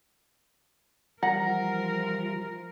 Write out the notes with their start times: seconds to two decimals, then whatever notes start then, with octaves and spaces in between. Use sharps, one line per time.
1.23 E3 F3 G3 F4 A#4 F#5 A#5